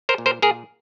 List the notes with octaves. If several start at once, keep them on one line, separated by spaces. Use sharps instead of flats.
A#4 C5
A#2
A#4 C5
A#2 G#4 A#4